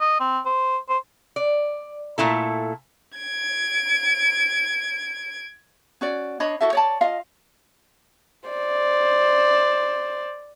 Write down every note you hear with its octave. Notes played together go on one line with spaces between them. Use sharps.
D#5
C4
C5
C5
D5
A#2 A3 E4 A4
G#6 D7
C#4 F#4 D5
D4 C#5 D#5 B5
E4 F#4 A4 E5
C#5 D5 A5
F4 D#5 F5
C5 D5